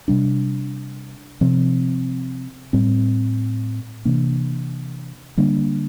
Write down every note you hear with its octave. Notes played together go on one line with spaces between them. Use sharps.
C3 G3 D4
C3 F3 C4
A2 G3 C4
C3 E3 A#3 D4
D3 G3 A#3 D4